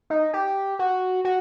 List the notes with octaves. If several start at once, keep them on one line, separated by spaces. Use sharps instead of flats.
D#4
G4
F#4
F#4